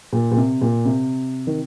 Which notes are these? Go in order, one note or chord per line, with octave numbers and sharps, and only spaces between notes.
A#2
A#2
C3
A#2
C3
D#3